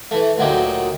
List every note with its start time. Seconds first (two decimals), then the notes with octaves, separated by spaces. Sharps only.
0.11 E3 A3
0.38 D2 A#2 F#3 D#4 G4